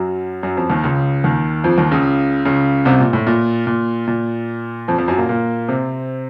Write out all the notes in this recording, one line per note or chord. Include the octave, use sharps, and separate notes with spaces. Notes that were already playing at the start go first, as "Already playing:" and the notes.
Already playing: F#2 F#3
F#2 F#3
F2 F3
D#2 D#3
C#2 C#3
D#2 D#3
F2 F3
D#2 D#3
C#2 C#3
C#2 C#3
C2 C3
A#2
A2
A#2
A#2
A#2
F2 F3
F2 F3
F#2 F#3
A#2 A#3
A#2 A#3
C3 C4